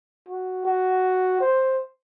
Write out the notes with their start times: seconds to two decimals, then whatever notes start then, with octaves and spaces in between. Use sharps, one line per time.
0.29 F#4
0.66 F#4
1.41 C5